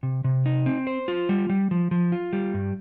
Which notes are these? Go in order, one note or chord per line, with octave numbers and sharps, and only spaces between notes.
C3
C3
D#4
C4
C5
F4
G3
G3
F3
F3
F4
G3
G2